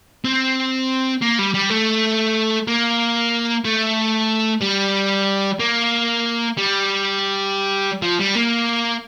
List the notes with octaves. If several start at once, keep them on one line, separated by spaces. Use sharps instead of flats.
C4
A#3
G3
G3
A3
A#3
A3
G3
A#3
G3
F3
G3
A#3